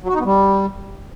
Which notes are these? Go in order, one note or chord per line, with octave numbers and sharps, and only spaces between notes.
F#3
F#4
D#4
B3
G3